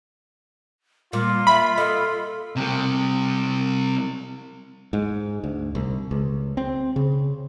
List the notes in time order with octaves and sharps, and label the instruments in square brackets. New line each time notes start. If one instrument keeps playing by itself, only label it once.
[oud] A#2 [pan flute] G3 [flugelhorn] F4
[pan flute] E5 [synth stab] B5
[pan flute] A4 [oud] D#5
[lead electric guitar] C3 G3
[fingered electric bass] G#2
D2
C2
C#2
C4
C#3